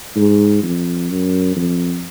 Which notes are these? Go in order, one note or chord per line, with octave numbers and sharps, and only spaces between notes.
G#2
F2
F#2
F2